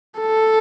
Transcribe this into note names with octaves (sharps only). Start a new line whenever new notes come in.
A4